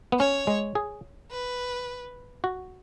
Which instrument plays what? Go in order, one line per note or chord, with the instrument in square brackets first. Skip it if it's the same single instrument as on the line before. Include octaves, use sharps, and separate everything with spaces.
[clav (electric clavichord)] B3
[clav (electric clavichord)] C#4 [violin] C#5
[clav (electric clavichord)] G#3
G#4
[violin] B4
[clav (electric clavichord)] F#4